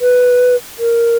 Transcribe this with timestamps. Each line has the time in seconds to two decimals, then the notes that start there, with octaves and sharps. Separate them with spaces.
0.01 B4
0.79 A#4